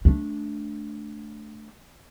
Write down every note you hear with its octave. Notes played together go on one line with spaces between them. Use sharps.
A3 D4